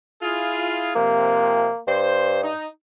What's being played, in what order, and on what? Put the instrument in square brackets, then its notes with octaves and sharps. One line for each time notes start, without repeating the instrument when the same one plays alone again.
[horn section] E4 F4 G#4
[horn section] C3 F3 [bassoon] A#3
[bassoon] G2 [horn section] C5
[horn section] D#4